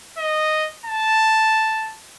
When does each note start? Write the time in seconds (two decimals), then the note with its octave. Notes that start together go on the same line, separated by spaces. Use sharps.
0.18 D#5
0.86 A5